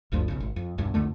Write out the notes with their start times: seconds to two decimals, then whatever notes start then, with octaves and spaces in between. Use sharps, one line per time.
0.12 G1 D2 G2 F3
0.28 B1 C#3
0.40 G#1
0.56 F2
0.78 B1 E2 G2
0.94 C2 F2 D3 A3